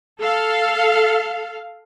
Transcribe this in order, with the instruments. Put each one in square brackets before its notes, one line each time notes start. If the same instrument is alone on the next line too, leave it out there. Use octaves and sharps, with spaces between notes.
[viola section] A4 F5